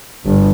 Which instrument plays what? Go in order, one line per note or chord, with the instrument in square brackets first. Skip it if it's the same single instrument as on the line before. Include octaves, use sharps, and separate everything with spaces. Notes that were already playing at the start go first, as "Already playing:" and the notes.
[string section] G1